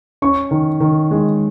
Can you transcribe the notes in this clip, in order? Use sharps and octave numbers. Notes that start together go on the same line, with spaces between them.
C#4 C#6
D#3
D#3
G#3